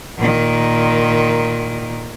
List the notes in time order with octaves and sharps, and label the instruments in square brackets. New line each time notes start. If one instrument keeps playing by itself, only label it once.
[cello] A#2 D#3